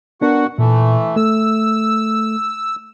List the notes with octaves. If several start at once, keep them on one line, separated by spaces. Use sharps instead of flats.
B3 D4 F#4 A#4 F#5
A#2 E3 A3
A3 E6